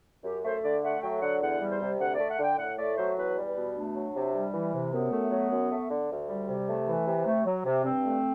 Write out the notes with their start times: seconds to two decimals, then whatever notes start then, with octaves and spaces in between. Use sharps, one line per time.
0.24 F#2 G4
0.44 A3 C5
0.63 D3 D5
0.83 A3 F#5
1.02 F#3 G5
1.22 D3 F#5
1.41 E2 F#5
1.61 G3
1.70 C5
1.81 C3
2.00 D2 F#5
2.15 D5
2.20 A3
2.30 F#5
2.39 D3 G5
2.58 A2 F#5
2.78 A3 D5
2.97 F#3 C5
3.17 E2 B4
3.37 G3
3.46 B4
3.56 B2
3.75 A3 D4
3.95 F#3
4.15 C3
4.34 G3
4.53 E3
4.73 C3
4.92 F#2 B3
5.11 A3
5.31 F#3
5.51 F#2
5.70 A3
5.90 D3
6.10 D2
6.29 G3
6.48 C3
6.67 A3
6.87 E3
7.07 C3
7.26 A3
7.45 F#3
7.65 C3
7.84 G2 C4
8.04 A3